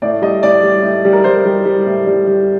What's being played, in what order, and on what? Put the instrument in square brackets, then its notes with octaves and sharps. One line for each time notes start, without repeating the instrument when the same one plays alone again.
[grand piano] A2 D5
G3 D#5
A2 D5
G3
A2
G3
A#4
G3 C5
G3
G3
A2
G3
G3